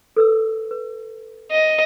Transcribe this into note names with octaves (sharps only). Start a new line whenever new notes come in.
A4 B4 E6
B4
D#5